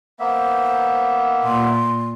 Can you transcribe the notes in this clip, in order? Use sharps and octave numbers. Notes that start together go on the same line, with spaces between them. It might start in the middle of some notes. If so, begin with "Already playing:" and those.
A#3 B3 C5 E5
A#2 C6